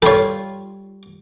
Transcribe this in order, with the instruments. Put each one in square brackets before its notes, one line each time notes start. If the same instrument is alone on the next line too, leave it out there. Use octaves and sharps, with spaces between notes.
[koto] G3 F4 [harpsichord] A4 C#5